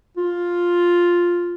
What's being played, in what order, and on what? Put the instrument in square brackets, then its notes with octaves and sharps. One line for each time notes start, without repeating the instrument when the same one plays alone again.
[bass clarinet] F4